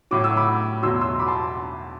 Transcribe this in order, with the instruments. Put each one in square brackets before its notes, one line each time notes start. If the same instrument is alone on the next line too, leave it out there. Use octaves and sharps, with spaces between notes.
[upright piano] A2 F#3 D6
E6
B5 D6
E2 B2 F#3 C6 E6
C6 E6
B5 D6
A5 C6